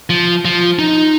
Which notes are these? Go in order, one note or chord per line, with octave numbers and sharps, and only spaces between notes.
F3
F3
D#4